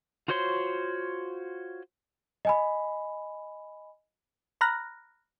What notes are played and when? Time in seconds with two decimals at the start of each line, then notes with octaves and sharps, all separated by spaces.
0.28 F4 F#4 C5 C#5 C6
2.45 D#5 G#5 B5
4.61 A#5 B5 F6 F#6 A#6